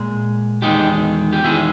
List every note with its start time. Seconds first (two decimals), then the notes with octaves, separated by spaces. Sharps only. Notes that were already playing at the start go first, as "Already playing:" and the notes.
Already playing: A#2 G#3
0.62 E2 D#3 G#3 D#4 G4
1.33 G4
1.44 E2 D#3 G#3 E4 G#4